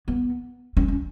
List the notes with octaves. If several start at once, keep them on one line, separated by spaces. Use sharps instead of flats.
B3
C#4
C#4